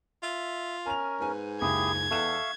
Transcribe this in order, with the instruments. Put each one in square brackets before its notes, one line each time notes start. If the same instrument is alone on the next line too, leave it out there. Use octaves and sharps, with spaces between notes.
[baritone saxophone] F4 [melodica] E5
[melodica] C#4 A#4 [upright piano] G#5 F7
[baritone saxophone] G#2 [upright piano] B4 G#5
[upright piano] F#1 C#2 G#5 [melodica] E4 G4 G#4 [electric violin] G#6
[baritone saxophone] E2 [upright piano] A4 F#6 E7 [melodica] E5 F5 C#6